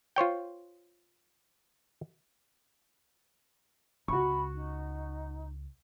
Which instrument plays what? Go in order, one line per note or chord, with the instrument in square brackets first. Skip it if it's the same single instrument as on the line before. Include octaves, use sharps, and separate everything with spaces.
[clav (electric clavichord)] F4 C5 C#5 G5
[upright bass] C#2 [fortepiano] F#4 C#6 [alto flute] B5
[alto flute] D#4